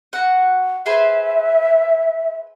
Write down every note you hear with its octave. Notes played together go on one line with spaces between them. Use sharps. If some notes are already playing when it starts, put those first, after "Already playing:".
F#4 F#5
G#4 B4 C5 E5